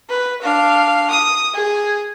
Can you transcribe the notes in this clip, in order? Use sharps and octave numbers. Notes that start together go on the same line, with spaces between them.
B4
D4 F5
D#6
G#4